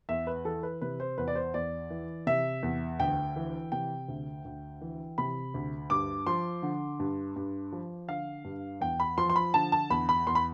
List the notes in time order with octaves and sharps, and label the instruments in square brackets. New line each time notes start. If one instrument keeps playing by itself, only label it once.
[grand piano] E2 E5
B4
E3 A4
B4
C3 B4
C5
E2 B4
D5
C5
E2 D5
E3
C3 E5
E2
D2 G5
E3
C3 G5
D2
D2
E3
C3 B5
D2
G2 D6
F3 C6
D3
G2
G2
F3
D3 F5
G2
E2 G5
B5
F3 C6
C6
B5
D3 A5
A5
E2 B5
B5
E2 C6
B5